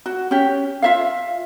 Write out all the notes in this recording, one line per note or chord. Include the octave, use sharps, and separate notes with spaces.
F#4
C#4 G4
F4 E5 F5